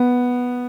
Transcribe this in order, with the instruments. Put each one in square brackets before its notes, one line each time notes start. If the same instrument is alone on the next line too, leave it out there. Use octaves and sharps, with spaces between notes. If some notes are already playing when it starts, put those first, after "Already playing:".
Already playing: [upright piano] B3